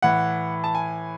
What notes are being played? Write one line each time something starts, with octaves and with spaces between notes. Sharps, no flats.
A2 E3 F#5
A5
G#5